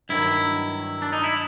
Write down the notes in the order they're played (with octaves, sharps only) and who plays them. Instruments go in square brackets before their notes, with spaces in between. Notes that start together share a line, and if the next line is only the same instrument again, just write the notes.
[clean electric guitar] G2 D#3 F#3 E4
D4
D#4
E4